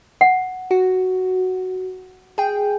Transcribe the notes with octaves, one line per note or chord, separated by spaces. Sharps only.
F#5
F#4
G#4 G5